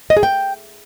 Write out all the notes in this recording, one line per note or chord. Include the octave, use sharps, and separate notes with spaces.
D#5
G#4
G5